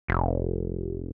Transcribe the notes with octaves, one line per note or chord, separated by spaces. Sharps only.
F1